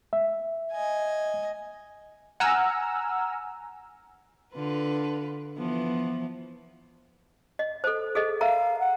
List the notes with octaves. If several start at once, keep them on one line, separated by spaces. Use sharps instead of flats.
E5
D#5 G#5
F#5 G#5 A#5 E6 F6
D3 F4 B4
E3 F3 B3
D#5
A4 C5
G#4 A4 D#5
A#4 E5 F5 A#5
F#5